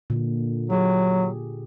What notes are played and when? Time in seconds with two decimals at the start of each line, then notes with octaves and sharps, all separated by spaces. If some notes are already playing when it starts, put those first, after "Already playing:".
0.10 A#2 D3
0.70 F#3 G4 G#4